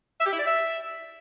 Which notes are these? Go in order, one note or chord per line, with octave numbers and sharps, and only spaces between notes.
E5
G4
E4
D5
E5